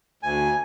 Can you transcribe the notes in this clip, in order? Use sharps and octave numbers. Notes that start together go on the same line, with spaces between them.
D2 G#5